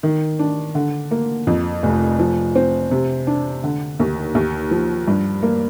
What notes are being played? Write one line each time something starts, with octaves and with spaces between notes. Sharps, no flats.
D#3
D4
D3
A#3
F2
F1
F3
C4
C3
D4
D3
D#2
D#2
F3
G2
A#3